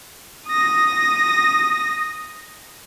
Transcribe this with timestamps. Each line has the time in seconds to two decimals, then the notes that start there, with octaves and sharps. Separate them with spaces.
0.48 D#6 A#6